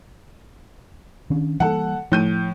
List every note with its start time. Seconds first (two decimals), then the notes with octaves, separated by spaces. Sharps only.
1.30 D#3 C#4 D4
1.60 E3 G3 A#3 A4 F#5
2.12 A2 F3 G6 D#7